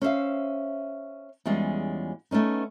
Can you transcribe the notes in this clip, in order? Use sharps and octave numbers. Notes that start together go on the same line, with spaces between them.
C#4 C5 E5 F5
E2 G3 G#3 C#4 F4 G#4
A3 B3 C#4 D#4